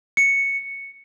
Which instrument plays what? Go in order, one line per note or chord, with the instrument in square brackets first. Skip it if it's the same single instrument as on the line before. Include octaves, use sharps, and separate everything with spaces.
[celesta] C#7